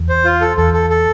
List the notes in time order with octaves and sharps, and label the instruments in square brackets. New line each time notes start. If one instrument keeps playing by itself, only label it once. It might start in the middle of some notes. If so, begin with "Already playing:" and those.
Already playing: [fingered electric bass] E2
[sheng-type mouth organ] C5
F4
A4
[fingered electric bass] E2 [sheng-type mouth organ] A4
[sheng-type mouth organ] A4
A4